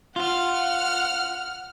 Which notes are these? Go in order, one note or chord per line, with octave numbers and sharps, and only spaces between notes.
F4 F#5 F6